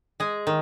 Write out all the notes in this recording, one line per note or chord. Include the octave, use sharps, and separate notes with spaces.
G#3 G#4
D#3